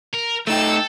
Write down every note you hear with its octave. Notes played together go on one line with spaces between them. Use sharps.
A#4
A3 D#4 A4 G5 E6